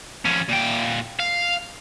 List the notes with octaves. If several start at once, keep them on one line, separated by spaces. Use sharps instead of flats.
F3 C#4
A#2 G5
F5